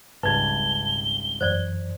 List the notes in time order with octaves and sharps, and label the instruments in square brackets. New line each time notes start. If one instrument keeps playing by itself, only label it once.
[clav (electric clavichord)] G#1 C#2 G3 [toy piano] B4 [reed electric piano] A5 G#6 [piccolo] G7
[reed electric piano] F#2 E3 [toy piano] C5 D5